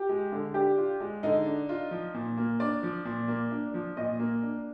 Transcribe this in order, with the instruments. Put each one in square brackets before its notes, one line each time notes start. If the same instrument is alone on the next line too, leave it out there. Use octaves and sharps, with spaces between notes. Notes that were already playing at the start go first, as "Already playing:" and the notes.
Already playing: [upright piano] G4
[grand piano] G#3
D3
[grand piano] D4 [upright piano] G4
[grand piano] F4
G#3
[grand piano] D3 [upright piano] D#4
[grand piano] D4
F4
F3
A#2
A#3
[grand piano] D4 [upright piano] D5
[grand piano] F3
A#2
A#3
D4
F3
[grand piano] A#2 [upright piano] D#5
[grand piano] A#3
D4